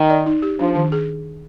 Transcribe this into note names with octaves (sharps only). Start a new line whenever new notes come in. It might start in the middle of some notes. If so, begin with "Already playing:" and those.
Already playing: D#3
D5
D#4
G4
F3 D4
D#3
G#4